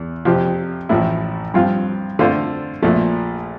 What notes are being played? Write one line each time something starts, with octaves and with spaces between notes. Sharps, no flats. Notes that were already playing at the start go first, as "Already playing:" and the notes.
Already playing: E2
F2 C3 F3 C4 G4
A1 A2 F3 A3 E4
G2 F3 C4 F4
D3 A3 C4 F4 C5
A#1 A#2 F3 A3